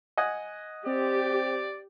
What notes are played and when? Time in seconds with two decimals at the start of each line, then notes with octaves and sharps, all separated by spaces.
0.18 D#5 F#5 G#5
0.86 C4 G4 D5